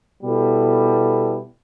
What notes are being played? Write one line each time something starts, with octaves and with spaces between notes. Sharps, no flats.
B2 G3 B3 E4 A4